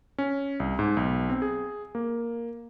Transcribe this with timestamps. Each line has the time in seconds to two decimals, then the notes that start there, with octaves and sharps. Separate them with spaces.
0.18 C#4
0.60 C2
0.79 G#2
0.97 B1
1.29 C4
1.42 G#4
1.95 A#3